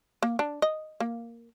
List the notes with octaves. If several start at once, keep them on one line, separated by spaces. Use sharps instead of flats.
A#3
D4
D#5
A#3